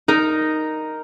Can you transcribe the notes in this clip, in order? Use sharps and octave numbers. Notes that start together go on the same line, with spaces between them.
D#4 A#4